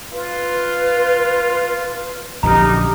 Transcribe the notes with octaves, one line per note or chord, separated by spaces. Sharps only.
F4 B4
A#1 F#2 D3 D#4 G4 A#5 F6